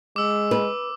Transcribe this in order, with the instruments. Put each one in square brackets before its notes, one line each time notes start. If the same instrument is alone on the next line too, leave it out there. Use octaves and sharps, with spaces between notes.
[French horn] G#3 [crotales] D6 E6
[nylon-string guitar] B4